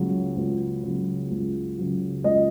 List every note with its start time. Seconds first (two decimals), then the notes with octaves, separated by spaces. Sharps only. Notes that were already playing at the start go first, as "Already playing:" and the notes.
Already playing: C#2 C#3 F#3
0.36 C#2
0.83 C#3 F#3
1.31 C#2
1.78 C#3 F#3
2.24 C#2 D#5